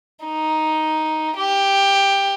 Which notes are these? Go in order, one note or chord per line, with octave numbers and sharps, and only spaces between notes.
D#4
G4